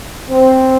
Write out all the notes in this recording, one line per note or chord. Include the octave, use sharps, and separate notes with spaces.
C4